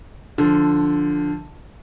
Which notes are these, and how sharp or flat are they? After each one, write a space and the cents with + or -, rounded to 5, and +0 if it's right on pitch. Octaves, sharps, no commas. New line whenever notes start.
D3 +0 F3 +0 A4 +0